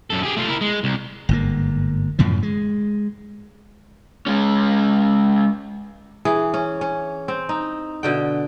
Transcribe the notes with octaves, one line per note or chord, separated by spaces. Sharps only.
F#2 A4
G4 G#4
A3 F4
E4 A#4
G#3
C2
G1 G#2 A#3
F#2 A2 C#3 F3
G#3
G#3 C#4
E3 G#4
C#4
C#4
C4
D#4
B2 D3 G5